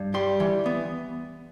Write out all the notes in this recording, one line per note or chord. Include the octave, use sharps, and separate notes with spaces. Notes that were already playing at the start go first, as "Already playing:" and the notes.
Already playing: G2
G3 C6
E3
B3